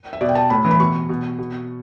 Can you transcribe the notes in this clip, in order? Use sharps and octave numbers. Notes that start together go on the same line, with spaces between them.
E5
B2 D5
G5
A5
A2 B5
E3
B5
B2 C#6
B2
B2